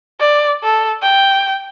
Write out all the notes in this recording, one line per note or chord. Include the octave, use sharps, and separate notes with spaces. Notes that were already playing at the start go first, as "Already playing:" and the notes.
D5
A4
G5